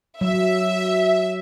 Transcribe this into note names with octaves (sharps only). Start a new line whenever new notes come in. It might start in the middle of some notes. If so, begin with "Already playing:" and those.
F#3 E5